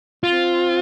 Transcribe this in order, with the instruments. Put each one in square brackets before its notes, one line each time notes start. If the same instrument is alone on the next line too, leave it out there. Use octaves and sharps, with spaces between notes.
[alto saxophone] C4 [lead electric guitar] F4